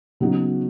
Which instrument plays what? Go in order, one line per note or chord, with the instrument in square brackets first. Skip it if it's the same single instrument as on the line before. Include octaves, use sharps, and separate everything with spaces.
[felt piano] C#3 F#3 B3 D#4 F#4